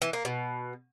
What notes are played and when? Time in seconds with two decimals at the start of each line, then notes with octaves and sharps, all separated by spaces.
0.02 E3
0.13 A#3
0.25 B2